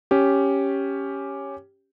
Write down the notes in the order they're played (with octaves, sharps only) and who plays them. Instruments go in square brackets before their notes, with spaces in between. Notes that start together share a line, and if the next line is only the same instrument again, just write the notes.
[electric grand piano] C#4 G4